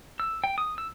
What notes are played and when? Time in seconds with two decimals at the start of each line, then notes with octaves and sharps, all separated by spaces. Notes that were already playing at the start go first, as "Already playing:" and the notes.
0.20 E6
0.44 G5
0.58 D#6
0.78 E6